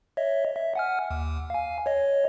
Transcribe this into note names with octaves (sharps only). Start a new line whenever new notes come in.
C#5 D#5 E5
E5
F#5 G#5 F6
D#2
F5 G#5
C#5 D#5